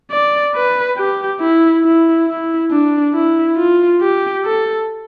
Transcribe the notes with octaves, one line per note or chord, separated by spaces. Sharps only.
D5
B4
G4
E4
E4
E4
D4
E4
F4
G4
A4